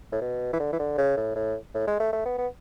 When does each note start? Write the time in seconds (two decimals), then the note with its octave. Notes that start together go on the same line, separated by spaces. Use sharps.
0.12 A2
0.21 B2
0.53 E3
0.60 D3
0.72 E3
0.79 D3
0.98 C#3
1.17 A2
1.36 A2
1.75 A2
1.87 G#3
2.00 A3
2.13 A3
2.25 B3
2.38 B3